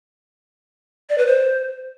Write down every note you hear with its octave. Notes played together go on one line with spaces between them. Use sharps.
D5
B4
C5